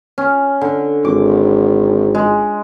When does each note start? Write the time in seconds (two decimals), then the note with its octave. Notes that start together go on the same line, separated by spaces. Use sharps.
0.18 C#4
0.61 D3
1.05 G#1 D6
2.15 G#3